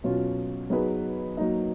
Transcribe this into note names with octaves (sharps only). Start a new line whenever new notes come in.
B2 F#3 C#4 F4
F#3 B3 D#4 G#4 B4
F#3 A#3 D#4